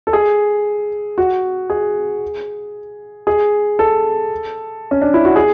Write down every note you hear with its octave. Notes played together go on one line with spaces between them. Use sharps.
A4
G#4
F#4
G#4
G#4
A4
C#4
D4
E4
F#4
G#4